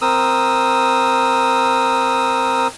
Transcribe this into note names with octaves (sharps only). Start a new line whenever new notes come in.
C4 A#4 D#6 E6